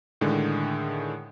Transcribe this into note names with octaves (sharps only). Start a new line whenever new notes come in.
A2 D3 D#3 G#3